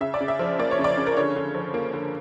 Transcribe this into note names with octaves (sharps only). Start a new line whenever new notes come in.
C#3 E5
D5
C#3
E5
F3
A#3 D5
C#5
C#3
D5
C#3
A#4
D3 C#5
D3
F3
A#3
D3